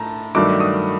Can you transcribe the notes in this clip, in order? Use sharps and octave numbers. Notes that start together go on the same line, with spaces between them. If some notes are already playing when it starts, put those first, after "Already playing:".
Already playing: A2 A5 A#5
G2 D#3 F#3 A3 D4 D6
D#6